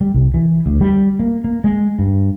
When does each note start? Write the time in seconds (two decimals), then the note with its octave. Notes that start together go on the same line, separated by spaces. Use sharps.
0.01 G3
0.14 C2
0.34 E3
0.66 D2
0.81 G3
1.19 A#3
1.44 A#3
1.64 G#3
1.99 G2